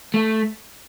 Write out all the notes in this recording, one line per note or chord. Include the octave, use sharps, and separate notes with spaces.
A3